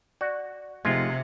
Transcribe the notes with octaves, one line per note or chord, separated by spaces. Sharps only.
F#4 D5
F1 C3 G#3 F4 G#6 A6 C7